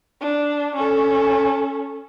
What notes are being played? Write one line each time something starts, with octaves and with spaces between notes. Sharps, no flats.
D4
C#4 A4